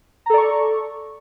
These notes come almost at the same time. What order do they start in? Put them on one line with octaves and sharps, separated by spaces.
A#5 A4 D5 C#6